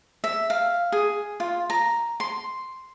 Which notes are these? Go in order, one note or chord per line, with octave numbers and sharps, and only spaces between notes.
E5
F5
G#4
F4
A#5
C6